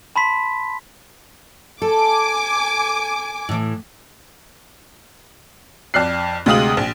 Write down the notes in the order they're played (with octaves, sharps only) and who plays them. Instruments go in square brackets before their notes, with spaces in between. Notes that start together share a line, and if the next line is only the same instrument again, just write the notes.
[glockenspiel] A5 B5 C6 B6
[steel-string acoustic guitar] A4 [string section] G#5 D6
[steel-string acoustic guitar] A2 E3
[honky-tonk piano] F2 D5 F6 F#6 C7
D2 C3 G#3 F5 D#6 F#7
A#1